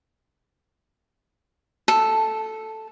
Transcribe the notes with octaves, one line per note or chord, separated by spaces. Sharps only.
A4